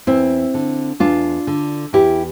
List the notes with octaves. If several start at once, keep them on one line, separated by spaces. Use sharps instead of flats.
E2 C4 E4
D3
E2 D4 F4
D3
E2 E4 G4